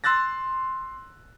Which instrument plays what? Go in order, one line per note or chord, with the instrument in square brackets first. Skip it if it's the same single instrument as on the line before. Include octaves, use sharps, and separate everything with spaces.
[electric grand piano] C6 E6 F#6 A6 A#6